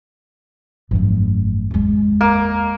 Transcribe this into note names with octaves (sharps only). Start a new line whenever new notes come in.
G#1 F#2 F3 A3
E2 G#3
A#3